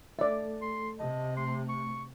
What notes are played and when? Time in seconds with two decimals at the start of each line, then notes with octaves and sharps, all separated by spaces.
0.19 A3 A4 D5 E5
0.62 C6
0.99 C3 D#5 A5
1.37 A3 C6
1.69 C#6